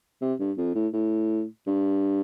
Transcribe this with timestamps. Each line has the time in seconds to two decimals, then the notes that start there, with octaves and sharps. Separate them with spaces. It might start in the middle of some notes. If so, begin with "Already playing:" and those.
0.21 C3
0.39 G2
0.58 F2
0.75 A2
0.93 A2
1.67 G2